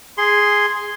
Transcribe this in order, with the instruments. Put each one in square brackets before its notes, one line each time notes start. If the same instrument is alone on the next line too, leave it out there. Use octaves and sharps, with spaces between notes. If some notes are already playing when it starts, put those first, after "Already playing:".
[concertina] G#4 C6